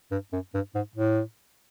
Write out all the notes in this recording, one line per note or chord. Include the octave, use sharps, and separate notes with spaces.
G2
F#2
G2
G#2
A2